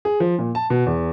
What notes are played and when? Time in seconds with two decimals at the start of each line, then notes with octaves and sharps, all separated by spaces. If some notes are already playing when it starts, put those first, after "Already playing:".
0.05 G#4
0.20 F3
0.39 A#2
0.55 A5
0.70 B2
0.86 E2